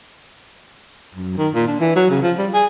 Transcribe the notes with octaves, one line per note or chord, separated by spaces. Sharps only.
F#2
D#3
A#2
D4
E3
F#3
C#3
F3
G3
G#4